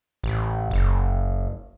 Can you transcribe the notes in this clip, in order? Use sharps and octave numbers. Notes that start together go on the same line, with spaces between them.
A1
F#1